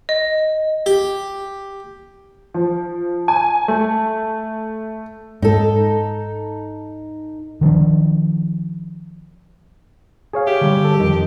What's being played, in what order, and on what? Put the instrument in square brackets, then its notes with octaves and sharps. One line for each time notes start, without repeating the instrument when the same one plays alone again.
[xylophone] D#5
[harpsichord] G4
[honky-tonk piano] F3
G#5
A3
[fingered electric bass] G#2 [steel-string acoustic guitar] D#4 A4
[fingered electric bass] D#3 F3 C4 D4
[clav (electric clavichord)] G#4 C#5 F5
[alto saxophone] G4 [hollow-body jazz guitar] E5
[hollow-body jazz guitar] D3 G3
[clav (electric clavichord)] A4
[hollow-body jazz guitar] F2 [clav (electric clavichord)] D#3